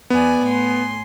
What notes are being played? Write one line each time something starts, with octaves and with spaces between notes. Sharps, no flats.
E2 B3 D5 G#5
A2 G#5 C6